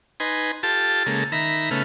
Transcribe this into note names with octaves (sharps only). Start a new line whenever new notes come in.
D#4 B4 G#5 C6
F4 G4 A4 A5
C#3 G#3 A#3 A4
D#3 E5 A#5 B5
C#3 A3 B3 F6